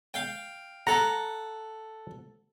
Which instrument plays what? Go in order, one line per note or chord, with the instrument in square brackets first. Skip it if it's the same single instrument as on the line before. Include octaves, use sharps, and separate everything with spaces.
[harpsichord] F5 G5
[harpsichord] A4 F#5 [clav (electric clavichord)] A#5